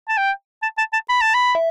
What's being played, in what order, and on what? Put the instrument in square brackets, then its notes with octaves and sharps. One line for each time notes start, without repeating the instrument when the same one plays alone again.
[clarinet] A5
G5
A5
A5
A5
B5
A5
B5
[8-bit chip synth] E5